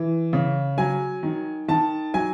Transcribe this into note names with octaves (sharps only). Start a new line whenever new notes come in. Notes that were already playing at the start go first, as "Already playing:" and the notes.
Already playing: E3
C#3
F#3 G#5
D#3
D#3 A5
F#3 G#5